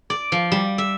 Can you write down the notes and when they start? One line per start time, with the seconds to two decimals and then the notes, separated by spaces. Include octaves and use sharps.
0.10 D5
0.32 F3
0.52 G3
0.78 E5